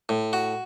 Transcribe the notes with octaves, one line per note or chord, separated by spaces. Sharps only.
A2
F#4